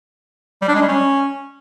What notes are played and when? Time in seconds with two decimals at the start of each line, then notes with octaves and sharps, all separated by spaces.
0.62 G3
0.69 D4
0.75 G#3
0.82 G3
0.89 C#4